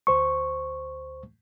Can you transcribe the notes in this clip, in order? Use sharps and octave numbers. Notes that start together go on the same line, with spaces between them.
D2 C5 C#6